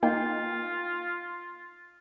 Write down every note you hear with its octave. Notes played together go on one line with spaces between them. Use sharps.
A#3 D#4 F4 G5